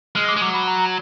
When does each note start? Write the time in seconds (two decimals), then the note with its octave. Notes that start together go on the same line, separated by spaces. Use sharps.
0.15 G#3 F6
0.29 D6
0.36 G#3
0.41 F#3 D6
0.54 B5
0.68 A#5